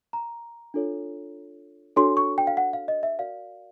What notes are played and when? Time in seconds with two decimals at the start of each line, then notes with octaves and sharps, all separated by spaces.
0.13 A#5
0.74 D4 F4 A4 C#5
1.96 D4 F#4 A4 C#5 C6
2.17 C#6
2.38 G5
2.47 F5
2.57 F#5
2.73 F5
2.88 D#5
3.03 E5
3.19 F#4 A#4 D5 F5